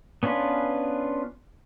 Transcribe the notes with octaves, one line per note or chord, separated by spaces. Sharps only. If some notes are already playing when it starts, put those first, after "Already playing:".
B3 C#4 D4 F4 B4